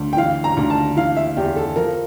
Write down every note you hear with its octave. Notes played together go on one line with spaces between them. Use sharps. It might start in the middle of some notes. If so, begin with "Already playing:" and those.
Already playing: D2
G5
E3 F5
A#5
D2
A5
E3 F5
E5
E2 G4
A4
F3 A#4